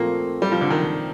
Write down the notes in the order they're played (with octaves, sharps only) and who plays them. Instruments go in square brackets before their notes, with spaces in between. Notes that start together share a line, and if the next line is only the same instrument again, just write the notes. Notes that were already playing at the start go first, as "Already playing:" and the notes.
Already playing: [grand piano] A#2 F3 A3 C4 [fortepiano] A#3
[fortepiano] G3
F3
D3
D#3